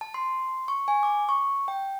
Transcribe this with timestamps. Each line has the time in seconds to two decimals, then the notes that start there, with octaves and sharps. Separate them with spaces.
0.01 A5
0.14 C6
0.68 C#6
0.88 G#5
1.03 D6
1.29 C#6
1.68 G5